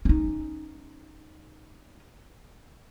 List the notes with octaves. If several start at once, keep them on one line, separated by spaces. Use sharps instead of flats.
C#4 D#4